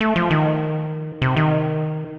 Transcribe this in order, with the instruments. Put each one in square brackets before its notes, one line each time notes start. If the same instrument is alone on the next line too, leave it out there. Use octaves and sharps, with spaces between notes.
[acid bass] A3
F3
D#3
C3
D#3